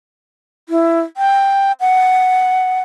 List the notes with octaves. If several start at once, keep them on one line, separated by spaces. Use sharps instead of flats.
E4
G5
F#5